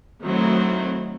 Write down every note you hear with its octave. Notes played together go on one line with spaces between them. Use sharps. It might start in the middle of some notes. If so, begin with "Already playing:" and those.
D#3 F#3 A3 C4 E4